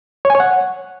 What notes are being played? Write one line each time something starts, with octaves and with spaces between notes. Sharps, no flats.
C#5
G#5
C#5
F#5